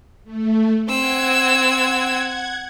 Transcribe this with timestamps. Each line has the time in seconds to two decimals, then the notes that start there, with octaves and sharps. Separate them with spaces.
0.24 A3
0.88 C4 F#5 E6 G#6